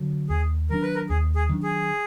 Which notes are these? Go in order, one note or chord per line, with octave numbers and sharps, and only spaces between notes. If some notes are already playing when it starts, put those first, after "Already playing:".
Already playing: D3 F#3
D#2 G#4
D#3 F#3 D4 A#4
B4
A#4
D#2 G#4
G#4
D#3 F#3 D4
G#4